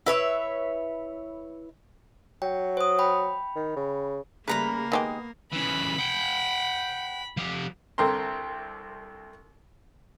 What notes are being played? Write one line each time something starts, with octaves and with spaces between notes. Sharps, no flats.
E4 B4 C#5 E5
F#3 G5
C5 D#6
G5 B5
D#3
C#3
C#3 G3 A3 A#3 B4 A#5 B5
D#3 G#3 B3 G4 D#6
C#3 E3 B5
F#5 G5
F3 G4
C2 D3 C4 A#4 A#5 C6